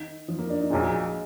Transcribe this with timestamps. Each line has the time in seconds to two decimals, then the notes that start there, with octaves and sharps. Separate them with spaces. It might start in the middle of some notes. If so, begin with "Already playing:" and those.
Already playing: D#3
0.28 F3
0.39 A#3
0.50 D4
0.60 D#4
0.70 A#1 A#2 F#3 G#3